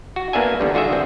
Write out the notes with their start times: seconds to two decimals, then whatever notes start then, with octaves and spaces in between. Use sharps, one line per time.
0.16 F#4
0.33 A#3 B3 D4 E5 G#5
0.60 E2 D3 G3
0.74 D3 F4 F#4 G#4 E5
0.88 D3 C4